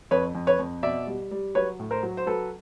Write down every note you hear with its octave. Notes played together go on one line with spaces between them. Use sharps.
F2 B4 C#5
F2
B4 C#5
F2
B2 D5 E5
G3
G3
F#3 B4 C#5
A2
A#4 C5
F#3
C5
F#3 A4 B4